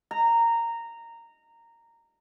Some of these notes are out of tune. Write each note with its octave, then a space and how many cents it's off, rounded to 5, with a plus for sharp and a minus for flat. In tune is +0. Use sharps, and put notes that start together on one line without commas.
A#5 -15